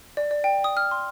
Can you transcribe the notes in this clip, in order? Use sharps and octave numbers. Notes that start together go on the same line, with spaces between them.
D5
D5
G5
D#6
F6
C6